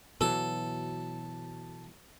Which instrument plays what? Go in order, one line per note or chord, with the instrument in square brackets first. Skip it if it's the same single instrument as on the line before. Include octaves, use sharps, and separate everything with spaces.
[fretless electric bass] B2 E3 F#3 [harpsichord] A4